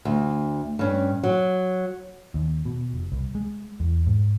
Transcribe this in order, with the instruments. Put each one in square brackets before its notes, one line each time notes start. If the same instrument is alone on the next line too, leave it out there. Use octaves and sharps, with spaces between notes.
[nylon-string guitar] D2
G2 C#4
F#3
[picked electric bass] D#2
B2
F1
C2
G#3
E2
G#2